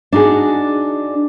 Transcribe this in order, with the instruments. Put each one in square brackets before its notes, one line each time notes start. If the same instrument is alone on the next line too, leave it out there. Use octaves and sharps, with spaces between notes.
[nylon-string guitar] D4 D#4 F#4 G#4